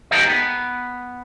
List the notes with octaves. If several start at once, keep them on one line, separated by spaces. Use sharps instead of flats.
D#4 G4 A4 A#4 C5 D#5
B3